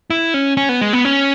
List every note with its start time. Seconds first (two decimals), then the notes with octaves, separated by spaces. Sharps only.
0.10 E4
0.34 C#4
0.57 C#4
0.69 B3
0.81 G#3
0.93 B3
1.05 C#4